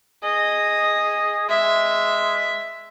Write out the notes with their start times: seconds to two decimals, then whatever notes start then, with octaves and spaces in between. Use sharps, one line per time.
0.23 G#4 D#5
1.49 G#3 E5